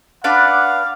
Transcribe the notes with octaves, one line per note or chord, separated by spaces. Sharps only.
D4 B4 D5 F5 F#5